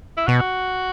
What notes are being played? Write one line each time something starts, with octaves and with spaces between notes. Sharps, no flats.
E4
B2 F#4